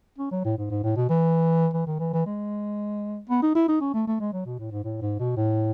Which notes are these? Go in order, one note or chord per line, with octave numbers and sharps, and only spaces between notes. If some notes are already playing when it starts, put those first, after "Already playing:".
C#4
F#3
A2
G#2
G#2
A2
B2
E3
E3
D#3
E3
E3
G#3
B3
D#4
E4
D#4
C#4
A3
A3
G#3
F#3
B2
A2
G#2
A2
G#2
B2
A2